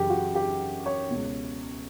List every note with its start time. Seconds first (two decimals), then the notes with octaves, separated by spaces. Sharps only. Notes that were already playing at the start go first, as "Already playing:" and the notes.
Already playing: F#2 C#3 E3 G4
0.10 F#4
0.35 G4
0.86 C#5
1.10 C#2 B2